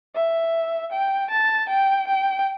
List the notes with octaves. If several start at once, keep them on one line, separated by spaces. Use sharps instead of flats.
E5
G5
A5
G5
G5